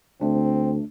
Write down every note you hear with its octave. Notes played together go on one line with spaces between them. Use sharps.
D2 A3 C4 D4